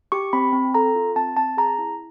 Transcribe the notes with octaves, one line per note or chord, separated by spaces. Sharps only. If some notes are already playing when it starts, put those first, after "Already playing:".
G4 C#6
C4 B5
C4
A4 A#5
F4
C4 A5
C4 A5
G#4 A#5
E4